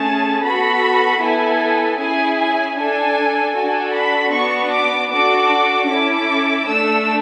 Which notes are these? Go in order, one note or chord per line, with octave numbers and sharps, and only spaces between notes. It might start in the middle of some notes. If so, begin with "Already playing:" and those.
Already playing: A3 C#4 G#4 A5
B3 F#4 A4 B5
B3 E4 A4 G#5
C#4 E4 G#4 G#5
G#5
D4 A4 G#5
D4 F#4 A4 G#5
B5
B3 D4 F#4 C#6
D6
D4 F#4 A4 D6
C#4 E4 A4 D6
A3 D4 A4 E6